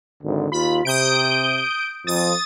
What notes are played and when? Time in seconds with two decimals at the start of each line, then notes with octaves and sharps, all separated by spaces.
0.22 G#1 D2
0.52 D#2 F4 B5
0.85 C3 D#6 G6 D7
2.07 F2 D#6 A6